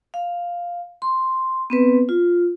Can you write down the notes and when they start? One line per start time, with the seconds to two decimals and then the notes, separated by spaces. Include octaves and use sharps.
0.14 F5
1.02 C6
1.70 B3 C4 B4
2.09 F4